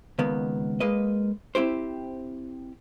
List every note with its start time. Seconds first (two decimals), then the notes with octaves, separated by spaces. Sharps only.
0.19 C#2 D#3 A#3 B3
0.80 G#3 A#3 B4 D#5
1.55 C4 E4 G4 C5